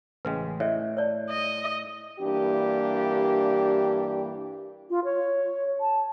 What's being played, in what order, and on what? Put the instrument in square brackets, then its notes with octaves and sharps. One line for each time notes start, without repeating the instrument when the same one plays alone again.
[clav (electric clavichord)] A1 C#3 G#3 [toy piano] B4 G5
[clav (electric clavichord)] A2 [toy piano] C#5 D#5 E5
[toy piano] C#5 D5 A5
[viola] D#5
[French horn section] G2 E3 A#3 D4 G4
[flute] F4
C#5
A5